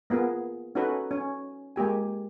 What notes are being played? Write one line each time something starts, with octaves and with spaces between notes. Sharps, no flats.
A#3 B3 F4 G#4
C#4 D#4 F#4 A4 B4
C#4
G#3 A#3 G4 G#5